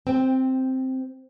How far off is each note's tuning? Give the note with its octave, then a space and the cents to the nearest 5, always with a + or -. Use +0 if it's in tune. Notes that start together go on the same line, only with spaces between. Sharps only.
C4 +0 G5 +20